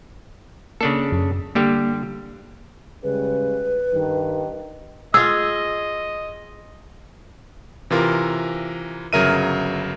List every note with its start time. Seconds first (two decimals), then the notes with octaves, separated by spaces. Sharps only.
0.81 C#3 A#3 D4 A4
1.12 F#2
1.55 D3 G3 A#3 G4
3.03 C#3 G3 G#3 B4
3.94 G2 D#3
5.14 F4 G#4 D#5 E6
7.90 C3 E3 F4 A#4
9.13 G1 C#3 F#3 A#4 E5 D#7